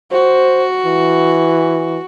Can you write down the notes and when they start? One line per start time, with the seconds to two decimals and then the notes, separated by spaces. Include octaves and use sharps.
0.12 F#4 C5
0.86 E3